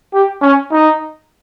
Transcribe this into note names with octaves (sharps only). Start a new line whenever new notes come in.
G4
C#4
D#4